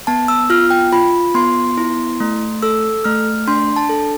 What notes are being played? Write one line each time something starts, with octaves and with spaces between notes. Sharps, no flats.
B3 A5
E6
F4 F6
G5
F4 B5
B3 C6
E4
A3
A4 E6
A3 F6
D4 C6
A5
A4